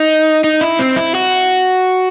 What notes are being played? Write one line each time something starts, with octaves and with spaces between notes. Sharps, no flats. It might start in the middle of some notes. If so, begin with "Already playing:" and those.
Already playing: D#4
D#4
E4
C4
E4
F#4